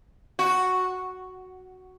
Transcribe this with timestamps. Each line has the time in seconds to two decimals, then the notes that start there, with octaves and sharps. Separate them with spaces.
0.39 F#4